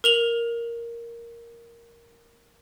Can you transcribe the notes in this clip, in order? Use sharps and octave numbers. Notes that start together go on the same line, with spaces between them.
A#4 F7 F#7